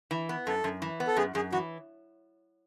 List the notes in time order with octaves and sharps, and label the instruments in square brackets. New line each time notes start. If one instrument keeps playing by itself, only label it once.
[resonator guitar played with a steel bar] E3
B3
[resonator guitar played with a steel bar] F#2 [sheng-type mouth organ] A4
[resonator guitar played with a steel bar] F#2
E3
B3
[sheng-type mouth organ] A4
[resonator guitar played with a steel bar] F#2 [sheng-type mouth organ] G#4
[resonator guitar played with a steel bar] F#2 [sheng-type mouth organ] G#4
[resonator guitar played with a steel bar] E3 [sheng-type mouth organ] F#4